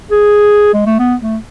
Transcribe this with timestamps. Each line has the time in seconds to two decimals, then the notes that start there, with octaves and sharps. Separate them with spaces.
0.11 G#4
0.74 G#3
0.86 A3
0.99 B3
1.21 A3